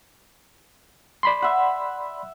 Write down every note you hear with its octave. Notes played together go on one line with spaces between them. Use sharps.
D5 B5 C6
E5 F#5